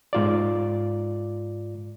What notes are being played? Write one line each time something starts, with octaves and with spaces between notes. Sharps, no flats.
G#2 F4 D5